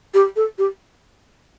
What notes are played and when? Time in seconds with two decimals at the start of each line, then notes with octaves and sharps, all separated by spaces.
0.14 G4
0.36 A4
0.58 G4